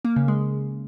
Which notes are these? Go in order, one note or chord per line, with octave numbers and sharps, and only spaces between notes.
A#3
C#3
G#3